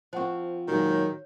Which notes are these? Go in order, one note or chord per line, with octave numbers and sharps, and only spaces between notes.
F3 C4 C5 F#5 C#6
A#2 D#3 F#3 G#3
C#5